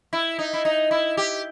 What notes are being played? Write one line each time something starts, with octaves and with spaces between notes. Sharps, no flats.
E4
D#4
E4
D#4
E4
G4